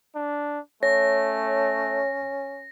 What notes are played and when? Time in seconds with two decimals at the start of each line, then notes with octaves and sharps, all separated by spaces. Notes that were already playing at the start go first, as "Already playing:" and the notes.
0.15 D4
0.83 A3 C#4 C#5 A#6